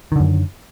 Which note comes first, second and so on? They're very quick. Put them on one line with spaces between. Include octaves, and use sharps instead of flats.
D#3 D3 F#2